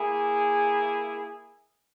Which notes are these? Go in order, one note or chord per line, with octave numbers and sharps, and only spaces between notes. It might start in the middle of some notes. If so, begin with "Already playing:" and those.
Already playing: A#3 E4 G#4